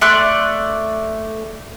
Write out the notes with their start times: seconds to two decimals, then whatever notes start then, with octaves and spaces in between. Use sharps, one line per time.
0.01 A3 D5 C6 F#6